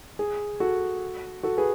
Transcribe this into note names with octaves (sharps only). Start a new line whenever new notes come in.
G#4
F#4 A4
F#4 A4
G#4 B4